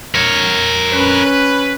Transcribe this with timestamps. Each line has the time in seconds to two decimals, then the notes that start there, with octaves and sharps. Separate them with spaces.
0.15 A#4 C#5
0.92 C#4 B4